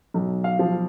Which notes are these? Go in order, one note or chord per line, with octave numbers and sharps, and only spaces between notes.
B1
F5
F3